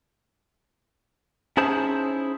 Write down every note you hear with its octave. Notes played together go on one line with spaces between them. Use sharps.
C#4 D#4 E4 G#4 C5 A5